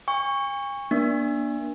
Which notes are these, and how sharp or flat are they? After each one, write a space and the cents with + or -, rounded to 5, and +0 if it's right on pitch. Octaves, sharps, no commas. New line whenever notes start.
G#5 -45 C#6 +0
A#3 +40 D4 +0